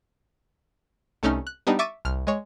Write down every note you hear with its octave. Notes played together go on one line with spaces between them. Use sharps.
C2 A3 C#4 D#4 F6
F#6
G3 B3 D4 D#4
E5 C#6 D6 A6 D7 D#7
C2 F6
G#3 C#5